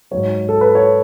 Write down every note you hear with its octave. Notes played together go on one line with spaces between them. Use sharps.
G#2 F#3 C#5
A4
B4
C#5